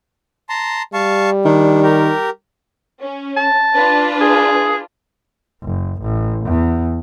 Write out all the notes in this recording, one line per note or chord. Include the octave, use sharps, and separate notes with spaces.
A5 A#5 C6
G3 F5 A5 C#6
D#3 D4
G4 A#4
C#4
A5
D4 F4 B4
G#4
F#1
A1
E2